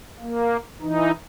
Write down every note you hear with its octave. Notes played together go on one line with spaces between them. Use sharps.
A#3
E3 D#4